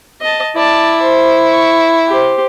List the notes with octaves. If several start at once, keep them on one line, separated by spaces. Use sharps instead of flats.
D#5 A5
E4 D5 A5
C5
C#6
G4 C5